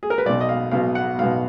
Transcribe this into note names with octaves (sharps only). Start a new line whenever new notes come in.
G#4
A#4
B4
B1 B2 D5
D#5
F5
B1 B2 F5
F#5
B1 F5
B2